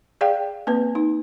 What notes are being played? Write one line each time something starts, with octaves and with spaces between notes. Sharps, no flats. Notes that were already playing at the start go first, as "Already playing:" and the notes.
G#4 D5 F5 G5
A#3 C4 B4
D#4